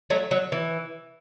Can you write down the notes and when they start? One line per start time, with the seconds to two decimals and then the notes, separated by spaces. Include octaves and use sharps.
0.10 F#3 A3
0.31 F#3
0.52 E3